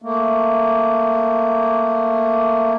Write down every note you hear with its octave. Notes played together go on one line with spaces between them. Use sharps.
A3 A#3